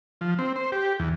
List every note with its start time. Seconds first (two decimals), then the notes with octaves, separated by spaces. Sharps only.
0.21 F3
0.39 C4
0.56 C5
0.72 G4
0.99 E2